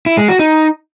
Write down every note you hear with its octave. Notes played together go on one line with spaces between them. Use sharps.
E4
G#3
F#4
D#4